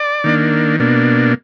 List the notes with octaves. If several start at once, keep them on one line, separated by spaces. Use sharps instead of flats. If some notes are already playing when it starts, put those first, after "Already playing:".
Already playing: D5
D#3 A#3 D4
B2 A#3 D4